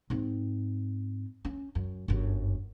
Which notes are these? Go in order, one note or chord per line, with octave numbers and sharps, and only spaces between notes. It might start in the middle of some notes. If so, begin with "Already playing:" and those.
G#2 C4
C#4
F#2
G1 F#2